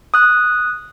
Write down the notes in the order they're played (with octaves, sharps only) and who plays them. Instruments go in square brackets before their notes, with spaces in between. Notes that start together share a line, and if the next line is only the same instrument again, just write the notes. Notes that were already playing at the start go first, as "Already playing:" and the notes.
[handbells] D#6 F#6